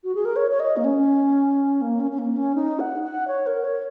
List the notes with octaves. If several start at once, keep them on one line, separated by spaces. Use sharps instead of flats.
F#4
G#4
A#4
C#5
C#5
D#5
A#3
C#4
A#3
C#4
C#4
A#3
C#4
D#4
F#5
F#5
C#5
A#4
C#5